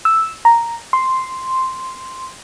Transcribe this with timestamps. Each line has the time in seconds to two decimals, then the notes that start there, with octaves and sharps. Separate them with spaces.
0.05 E6
0.45 A#5
0.93 C6